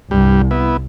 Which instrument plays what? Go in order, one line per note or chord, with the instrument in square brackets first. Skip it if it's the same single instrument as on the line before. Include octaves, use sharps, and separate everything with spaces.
[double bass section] C2 [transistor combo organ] G2 G3
[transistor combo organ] B3 E4